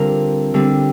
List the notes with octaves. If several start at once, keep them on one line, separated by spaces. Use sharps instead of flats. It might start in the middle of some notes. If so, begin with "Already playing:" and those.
Already playing: D3 G3 C4 F4 A#4
D3 G3 C4